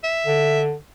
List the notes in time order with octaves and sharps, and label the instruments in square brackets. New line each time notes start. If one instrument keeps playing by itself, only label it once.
[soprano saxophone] E5
[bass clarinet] D3